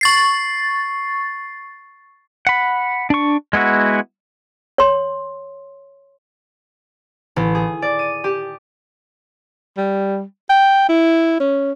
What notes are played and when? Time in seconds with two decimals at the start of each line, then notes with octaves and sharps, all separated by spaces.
0.01 C#6 A6 C7
2.47 F#5 B5
3.10 D4 C#6
3.53 G#3 B3 E4 F#4
4.78 C#5 C6
7.36 A1
7.55 G#4
7.82 D5
7.99 D#7
8.24 G4
9.77 G3
10.50 G5
10.89 E4
11.40 C#4